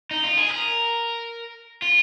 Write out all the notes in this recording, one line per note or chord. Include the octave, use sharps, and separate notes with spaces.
D#4
F4
G#4
A#4
F4